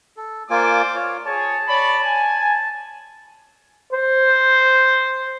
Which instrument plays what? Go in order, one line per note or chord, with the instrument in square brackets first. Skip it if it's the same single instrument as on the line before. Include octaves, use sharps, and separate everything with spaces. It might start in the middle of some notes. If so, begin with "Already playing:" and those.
[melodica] A4
[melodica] A#3 F4 G#5 [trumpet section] C5 D5 D6
[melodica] F4 C#5
[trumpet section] G#4 C#5 [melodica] A5
[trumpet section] C#5 D5 B5
G#5
[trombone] C5